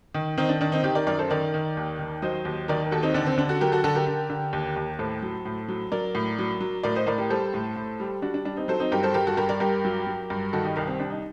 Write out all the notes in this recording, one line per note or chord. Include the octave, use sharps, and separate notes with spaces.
D#3
D#3 C4 D#4
D4
D#3 D4
C4 D#4
D#3 D#4 G4
A#4 D5
F#2 A#4 D5
A4 C5
D#3 A#4 D5
D#3
D#2
D#3
F#3 C5 D#5
D#2
D#3 A#4 D5
A#4
D#2 F#4 A4
C4 D#4
D3 D4
C4
D3 D4
F#4 A4
F#3 G4 A#4
F#4 A4
D3 F#4 A4
G4 A#4
D3
D3
D#2
D#2
A2 A4 C5
F#3
A2
F#3
F#3 A#4 D5
A2
F#3
F#3
A2 A#4 D5
C5 D#5
A2 A#4 D5
G4 A#4
G3 A4 C5
A2
A2
G3
G3 D4 F#4
D4
G3 D4
C4 D#4
F#3 A4 C5
C4 D#4
G2 G4 A#4
A4 C5
G2 G4 A#4
F#4 A4
G2 G4 A#4
A#4 D5
G2 G4 A#4
F#3
F#3
G2
D#3 F#4 A4
D#4 G4
C2 G4 A#4
C4
C2 D4
D#4